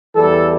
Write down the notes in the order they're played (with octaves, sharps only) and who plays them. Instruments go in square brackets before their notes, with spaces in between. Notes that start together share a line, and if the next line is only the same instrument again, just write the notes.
[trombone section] E2 E3 G3 A4